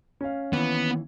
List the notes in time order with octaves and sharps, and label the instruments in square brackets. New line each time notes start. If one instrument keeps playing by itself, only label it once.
[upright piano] C#4 F5
[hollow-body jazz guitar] D#2 E3 [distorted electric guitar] B3